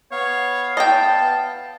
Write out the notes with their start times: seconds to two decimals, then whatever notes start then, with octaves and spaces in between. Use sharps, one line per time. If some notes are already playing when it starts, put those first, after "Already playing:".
0.12 B3 C#5 F5
0.77 D#5 G5 A5